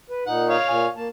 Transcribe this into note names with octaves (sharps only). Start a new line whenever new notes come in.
B4
A#2 D#4 F#5
C#5 F5
A#2 G#5
A#3 A5